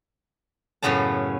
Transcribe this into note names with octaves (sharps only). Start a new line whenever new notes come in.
F#2 A2 C#3 B3 C#4 A5